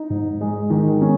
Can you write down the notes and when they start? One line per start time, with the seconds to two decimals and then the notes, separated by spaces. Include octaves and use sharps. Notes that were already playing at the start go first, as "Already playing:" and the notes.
Already playing: D#4
0.10 G#2
0.41 G#3
0.70 D#3
1.01 C#4